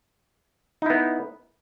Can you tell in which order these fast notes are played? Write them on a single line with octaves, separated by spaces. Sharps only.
D#4 E4 B3